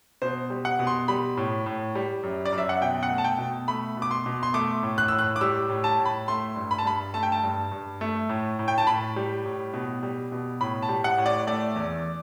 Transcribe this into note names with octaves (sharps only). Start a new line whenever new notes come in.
B2 C5
G3
F#5
B2
C6
G3 B5
A2
A2
G3
F#2
D5
F#2
E5
F#5
B2 G5
F#5
A3
A5
G5
B2
A3 B5
B2
D6
C6
B2
C6
A3 D6
A2
F#6
A2 E6
F#6
D6
G3 E6
A2
A5
A2
B5
A3 C6
G2
B5
A5
G2 B5
A3 A5
G5
A5
G2
G2
A3
A2
A2
G5
A5
A2 B5
G3
A2
B2
G3
B2
A2 B5
A5
G3
F#5
A2
D5
A3 D5
E2